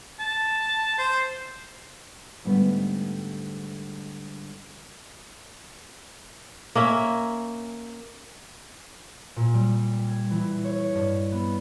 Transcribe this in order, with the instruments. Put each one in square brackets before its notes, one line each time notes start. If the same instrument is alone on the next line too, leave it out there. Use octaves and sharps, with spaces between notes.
[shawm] A5
C5
[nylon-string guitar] G#2 D3 G3 A3 B3
[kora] A#3 C#4 E5
[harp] A#2
G3
G#6
E3
C#5
G2
B3